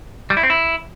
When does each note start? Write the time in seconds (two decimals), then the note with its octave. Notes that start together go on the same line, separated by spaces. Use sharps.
0.30 G3
0.37 E4
0.43 C4
0.50 E4